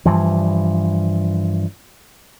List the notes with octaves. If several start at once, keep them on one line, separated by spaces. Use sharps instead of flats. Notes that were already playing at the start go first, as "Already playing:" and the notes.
G2 E3 F3